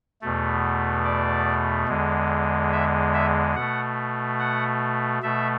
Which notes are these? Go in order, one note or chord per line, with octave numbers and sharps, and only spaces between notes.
E2 B2 A3
D5
E2 D3 G#3
E5
E5
B2 A3 F#5
F#5
B2 A3 E5